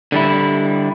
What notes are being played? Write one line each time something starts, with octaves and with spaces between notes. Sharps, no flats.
D3 G3 E4